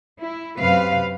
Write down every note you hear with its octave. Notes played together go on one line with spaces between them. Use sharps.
E4
F#2 C3 B4 F5